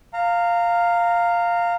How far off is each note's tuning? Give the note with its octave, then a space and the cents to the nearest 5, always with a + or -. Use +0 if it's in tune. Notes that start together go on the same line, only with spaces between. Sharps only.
F5 +0 A#5 -20